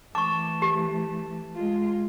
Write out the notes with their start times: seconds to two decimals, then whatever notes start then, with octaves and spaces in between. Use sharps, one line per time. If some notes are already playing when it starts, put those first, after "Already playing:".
0.15 E3 A3 A5 C#6 D6
0.62 G4
1.55 G#3 F4